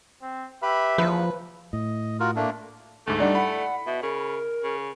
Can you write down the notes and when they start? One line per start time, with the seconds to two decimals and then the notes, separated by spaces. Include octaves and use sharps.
0.22 C4
0.62 G4 B4 E5 B5
0.98 E2 F3 A#3 B3 B4
1.73 A2 D#5
2.20 F4 F#4 A#4
2.36 A3 A#3 D4
3.07 D2 G#2 A3
3.20 G3 D4 D#4 D5 F#5
3.35 E4 F#5 B5
3.86 B2 E5
4.02 C#3 A#4
4.63 C#3